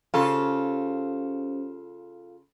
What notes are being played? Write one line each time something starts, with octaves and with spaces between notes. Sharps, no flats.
C#3 C#4 F4 G4 A4 C5